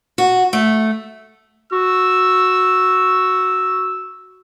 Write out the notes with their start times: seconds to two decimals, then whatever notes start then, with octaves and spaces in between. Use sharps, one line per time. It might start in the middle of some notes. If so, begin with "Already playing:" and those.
0.18 F#4
0.53 A3
1.72 F#4 E6